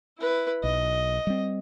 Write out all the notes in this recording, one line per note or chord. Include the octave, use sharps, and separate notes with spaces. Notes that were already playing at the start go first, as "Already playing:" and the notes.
E4 B4
B1 D#5
G3 C4